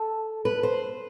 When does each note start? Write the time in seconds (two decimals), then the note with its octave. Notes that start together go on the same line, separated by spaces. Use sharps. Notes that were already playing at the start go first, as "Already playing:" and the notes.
Already playing: A4
0.45 B4
0.63 C5